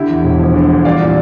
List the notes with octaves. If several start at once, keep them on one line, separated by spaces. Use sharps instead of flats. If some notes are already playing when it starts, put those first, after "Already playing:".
Already playing: D3 E4 G4
E2
E1
F3
D3
E2
G3 D5 F5
A#2